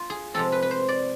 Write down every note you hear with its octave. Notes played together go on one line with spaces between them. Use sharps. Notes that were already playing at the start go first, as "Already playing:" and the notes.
Already playing: F4
G#4
C3 F3 G#3 C4 A4
B4
B4
C5
D5